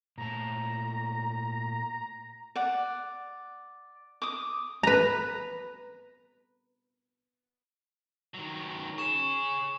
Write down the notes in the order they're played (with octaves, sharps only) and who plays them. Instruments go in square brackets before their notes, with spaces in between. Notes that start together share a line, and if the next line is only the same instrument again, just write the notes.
[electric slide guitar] A#2 A3 A5 [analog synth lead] A#5
[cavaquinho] D5 F#5
D6 D#6
[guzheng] B4 A#5
[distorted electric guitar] D#3 F#3
[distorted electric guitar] G#4 C#5 [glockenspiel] C#6 E7